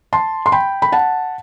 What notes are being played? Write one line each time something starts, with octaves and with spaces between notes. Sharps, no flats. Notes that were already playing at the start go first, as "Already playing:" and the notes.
A5 C6
C6
G5 B5
B5
F#5 A5